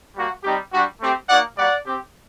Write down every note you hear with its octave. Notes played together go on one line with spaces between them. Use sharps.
G3 A#3 F#4
G3 C4 D#4 G4
G3 D4 F#4
A3 C4 G4
A#3 D#4 F#4 D5 F#5
G3 A#3 F#4 D5 F#5
C4 G4